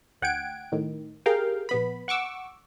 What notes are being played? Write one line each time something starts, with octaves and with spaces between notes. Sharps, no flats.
D2 F#5 G5 G#6 D7
A2 D#3
G4 G#4 A#4 F5 G5
A#1 B3 B5
F#5 C#6 D6 E6